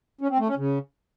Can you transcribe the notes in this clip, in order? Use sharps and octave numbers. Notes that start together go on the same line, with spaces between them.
C#4
C4
A3
C#4
C#3